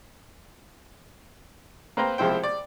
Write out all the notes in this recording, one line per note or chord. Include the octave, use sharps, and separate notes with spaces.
A#3 C4 B4 C5 G5 A#5
C2 F3 G#3 E4 C5 G5
D5